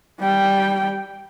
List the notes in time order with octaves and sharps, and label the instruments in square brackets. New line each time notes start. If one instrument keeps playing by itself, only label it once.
[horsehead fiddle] G3 G5